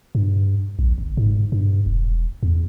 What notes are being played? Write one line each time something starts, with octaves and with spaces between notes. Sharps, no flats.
G2
A#1
G1
G#2
G2
E1
E2